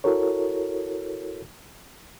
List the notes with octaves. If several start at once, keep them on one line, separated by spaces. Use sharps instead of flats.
E4 F#4 A4 A#4 C#5